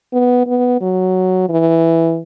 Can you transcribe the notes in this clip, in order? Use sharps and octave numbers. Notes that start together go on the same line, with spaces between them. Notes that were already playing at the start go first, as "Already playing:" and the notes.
B3
B3
F#3
E3